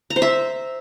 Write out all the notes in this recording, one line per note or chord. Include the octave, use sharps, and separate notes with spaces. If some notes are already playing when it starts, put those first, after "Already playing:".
A#5
C5
E5